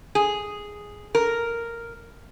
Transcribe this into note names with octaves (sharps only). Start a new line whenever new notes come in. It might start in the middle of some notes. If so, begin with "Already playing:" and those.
G#4
A#4